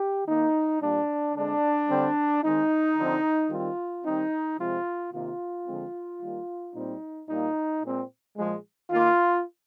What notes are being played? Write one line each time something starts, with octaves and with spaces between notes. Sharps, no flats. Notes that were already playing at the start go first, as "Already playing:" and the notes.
Already playing: G4
D#3 A#3 D#4
A#2 G3 A#3 D4
D3 G#3 C4 D4
D3 G3 C4
D#3 G#3 C4 D#4
D3 F3 C4
D#3 G3 C4 F4
D#3 G3 C4 D#4
C3 F3 G#3 C4 F4
C3 D#3 A#3 F4
D3 F3 G#3 C4
D#3 G3 A#3
A#2 G3 C4 D#4
A#2 G3 A#3 D#4
A#2 G#3 C4
A#2 F3 G#3
D#3 A#3 F4